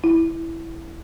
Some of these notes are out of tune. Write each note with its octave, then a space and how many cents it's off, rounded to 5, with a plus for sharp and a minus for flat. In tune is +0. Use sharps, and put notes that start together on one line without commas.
E4 +0